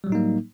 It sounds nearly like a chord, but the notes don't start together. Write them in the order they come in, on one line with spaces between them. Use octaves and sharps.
G3 F#3 A2 D#4 A#3